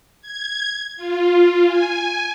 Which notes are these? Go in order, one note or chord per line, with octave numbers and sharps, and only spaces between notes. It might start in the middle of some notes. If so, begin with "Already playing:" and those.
G#6
F4
G#5